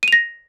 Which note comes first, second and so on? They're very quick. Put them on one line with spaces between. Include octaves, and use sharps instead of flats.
D#7 F7 A#6